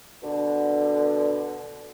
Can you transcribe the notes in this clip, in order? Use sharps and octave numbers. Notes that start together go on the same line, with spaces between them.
B2 D3